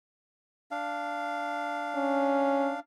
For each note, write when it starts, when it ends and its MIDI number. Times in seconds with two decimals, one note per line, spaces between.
0.71 2.80 62
0.71 2.80 77
1.95 2.73 61